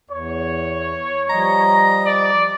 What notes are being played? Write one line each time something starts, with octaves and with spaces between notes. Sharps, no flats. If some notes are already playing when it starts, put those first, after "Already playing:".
E2 C#5
F3 G3 D#5 A#5
D5